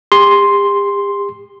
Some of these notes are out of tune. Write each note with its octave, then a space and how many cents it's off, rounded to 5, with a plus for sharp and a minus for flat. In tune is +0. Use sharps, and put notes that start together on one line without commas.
G4 +40 C6 +0